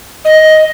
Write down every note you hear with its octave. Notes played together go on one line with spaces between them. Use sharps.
D#5